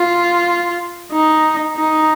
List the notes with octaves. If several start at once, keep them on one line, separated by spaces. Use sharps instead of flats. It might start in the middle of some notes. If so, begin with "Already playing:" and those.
Already playing: F4
D#4
D#4